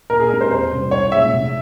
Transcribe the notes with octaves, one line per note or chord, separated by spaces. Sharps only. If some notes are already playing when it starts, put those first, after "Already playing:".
A#2 A#4
G#4
G#3 C4 G4 A#4
C5
E2 C5
C3 G3 C4
C2 C#5
A#2 G#3 C#4 E5
F1